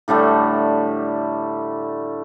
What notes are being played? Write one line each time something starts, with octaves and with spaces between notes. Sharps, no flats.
A2 D3 G3 A3